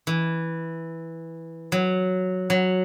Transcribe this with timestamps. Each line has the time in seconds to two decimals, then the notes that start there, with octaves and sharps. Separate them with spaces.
0.07 E3
1.72 F#3
2.50 F#3